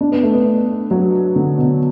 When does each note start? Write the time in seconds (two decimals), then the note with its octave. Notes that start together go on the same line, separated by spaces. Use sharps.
0.01 D4
0.12 B3
0.23 A3
0.34 B3
0.91 F#3
1.36 D3
1.58 B2